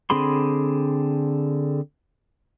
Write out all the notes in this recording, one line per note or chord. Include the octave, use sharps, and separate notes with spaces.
D3 C4 G#4 B5 C6